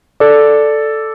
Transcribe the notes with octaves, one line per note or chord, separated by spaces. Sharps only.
A4 D5